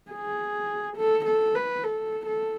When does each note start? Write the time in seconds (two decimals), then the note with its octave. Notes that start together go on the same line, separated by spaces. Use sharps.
0.12 G#4
0.97 A4
1.26 A4
1.55 B4
1.84 A4
2.27 A4